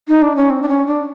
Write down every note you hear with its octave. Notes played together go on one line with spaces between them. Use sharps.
D#4
D4
C#4
C4
D4
C#4
D4